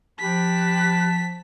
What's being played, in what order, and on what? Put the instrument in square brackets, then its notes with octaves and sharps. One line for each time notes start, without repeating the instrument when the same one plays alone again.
[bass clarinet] F3 [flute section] G4 B5 F#6 [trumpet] A5 [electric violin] B6